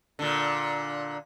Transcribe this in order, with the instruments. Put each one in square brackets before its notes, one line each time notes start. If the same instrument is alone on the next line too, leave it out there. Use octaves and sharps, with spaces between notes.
[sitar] A#2 D3